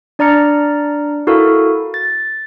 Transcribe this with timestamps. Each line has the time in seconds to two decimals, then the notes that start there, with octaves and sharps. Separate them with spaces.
0.19 D4 D5 A#5 F6 C#7
1.27 E4 F#4 A4 A#4 F5
1.94 A6